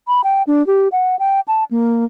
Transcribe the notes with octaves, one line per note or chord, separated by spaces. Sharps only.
B5
G5
D4
G4
F#5
G5
A5
A#3